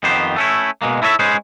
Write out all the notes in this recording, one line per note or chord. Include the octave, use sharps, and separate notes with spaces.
F2 D#3 B3 G4 C5
A3 C#4 E4
B2 G#3 A#3
E4 A4 C#5 D#5 E5
G#3 C#4 G#4 B4 C5